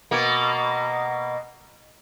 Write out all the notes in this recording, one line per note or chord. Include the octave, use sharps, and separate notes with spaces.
B2 A#3